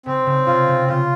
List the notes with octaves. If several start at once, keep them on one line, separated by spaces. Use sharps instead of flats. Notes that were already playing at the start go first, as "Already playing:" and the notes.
C#3 C4
C#3
C3 F4
C#3
C#3 F4